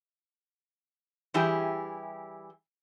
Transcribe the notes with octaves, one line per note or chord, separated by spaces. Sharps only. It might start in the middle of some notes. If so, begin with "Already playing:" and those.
E3 G3 E4 G4 G#4